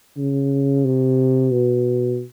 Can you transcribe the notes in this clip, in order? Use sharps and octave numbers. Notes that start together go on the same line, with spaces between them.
C#3
C3
B2